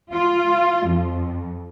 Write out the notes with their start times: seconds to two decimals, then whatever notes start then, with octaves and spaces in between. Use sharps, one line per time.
0.12 F4
0.88 F2